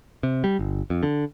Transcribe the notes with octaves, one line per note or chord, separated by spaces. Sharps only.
C3
G3
G1
F2
D3